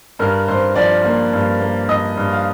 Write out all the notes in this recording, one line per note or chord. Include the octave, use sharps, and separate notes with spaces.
G2 A#4
G2 C5
F3 D5
A#3
G2
A#3
G2 D#5
G2
F5